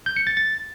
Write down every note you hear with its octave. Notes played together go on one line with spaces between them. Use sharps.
G6
C#7
A6
A6